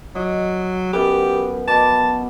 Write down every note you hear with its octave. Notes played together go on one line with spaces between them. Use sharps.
F#3 D#5
F#2 B3 G4 B4
B2 A5 D6